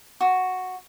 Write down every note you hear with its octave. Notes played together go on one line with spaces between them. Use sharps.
F#4